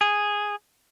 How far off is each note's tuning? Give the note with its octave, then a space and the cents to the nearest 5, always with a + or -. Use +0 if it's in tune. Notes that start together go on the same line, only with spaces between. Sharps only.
G#4 -5